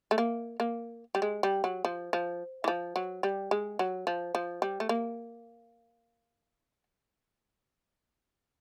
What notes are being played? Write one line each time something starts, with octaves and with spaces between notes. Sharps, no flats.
A3
A#3
A#3
G3
G#3
G3
F#3
F3
F3
E3
F3
F#3
G3
G#3
F#3
F3
F3
G3
A3
A#3